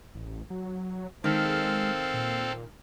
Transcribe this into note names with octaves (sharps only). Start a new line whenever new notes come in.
A1
F#3
D#3 G#3 C4 A4 F5
A#2